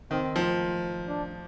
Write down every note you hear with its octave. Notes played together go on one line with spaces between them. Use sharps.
D#3 C4
F3
D4